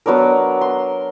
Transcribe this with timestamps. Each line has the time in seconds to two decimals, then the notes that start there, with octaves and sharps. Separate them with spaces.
0.06 F#3 B3 D4 A#4
0.61 C6